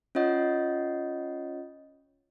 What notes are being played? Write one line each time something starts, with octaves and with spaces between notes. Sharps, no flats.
C#4 F4 C#5 D#5 F#5